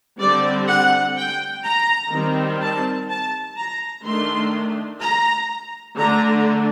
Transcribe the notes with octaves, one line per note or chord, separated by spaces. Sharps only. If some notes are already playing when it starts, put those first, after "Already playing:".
D3 G3 C4 D5
F#5
G5
A#5
D#3 G3 C4
A5
A5
A#5
D#3 A3 D4 C6
A#5
D3 A3 D4 A#5